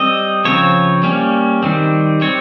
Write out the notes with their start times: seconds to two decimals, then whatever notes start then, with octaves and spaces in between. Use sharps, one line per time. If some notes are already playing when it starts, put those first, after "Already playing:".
Already playing: G3 C4 D#5
0.45 C#3 F3 C4 C#5
1.03 G3 A#3 C#4
1.63 D#3 G3 C4
2.21 G3 C4 C#5